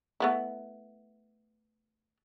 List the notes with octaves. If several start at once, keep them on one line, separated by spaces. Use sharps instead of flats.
A3 B3 E4